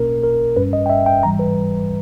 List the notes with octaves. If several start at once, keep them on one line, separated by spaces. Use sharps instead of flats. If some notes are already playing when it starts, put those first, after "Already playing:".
Already playing: B1 B2 A#3 C#4 A#4
A#4
G1 G2 G3 C#4 B4
D#5
G5
E5
G5
G#2 E3 G3 A#5
B4